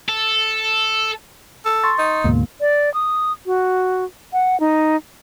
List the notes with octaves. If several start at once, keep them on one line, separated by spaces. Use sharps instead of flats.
A4
A4
C6 C#6 A6
D#4
D2 G#2 B2 A#3
D5
D#6
F#4
F#5
D#4